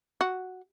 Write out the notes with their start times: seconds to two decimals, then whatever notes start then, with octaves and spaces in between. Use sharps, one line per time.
0.21 F#4